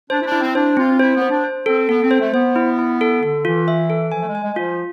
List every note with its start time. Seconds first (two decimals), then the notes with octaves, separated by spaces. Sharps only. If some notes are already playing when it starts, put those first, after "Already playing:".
0.10 D4 C5
0.21 E4
0.25 D4
0.32 E4
0.40 C4
0.55 D4 C5
0.77 C4 F4
0.99 E4 C5
1.15 B3
1.22 C5
1.29 D4
1.44 C5
1.66 C4 A4
1.89 B3 A4
2.03 C4
2.11 C5
2.19 A3
2.33 B3 C5
2.56 E4
2.79 E4
3.01 A4
3.23 D3 A4
3.45 E3 F4
3.68 E5
3.90 A4
4.12 F3 G#5
4.20 A3
4.27 G#3
4.35 G#5
4.42 G#3
4.53 G#3
4.56 F3 F4